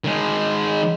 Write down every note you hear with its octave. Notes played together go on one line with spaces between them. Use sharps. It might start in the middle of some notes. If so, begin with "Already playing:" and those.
D#3 G#3